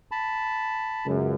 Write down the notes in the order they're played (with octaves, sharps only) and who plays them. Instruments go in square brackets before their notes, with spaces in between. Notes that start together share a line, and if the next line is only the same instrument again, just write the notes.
[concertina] A5 B5
[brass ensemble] C#2 F#2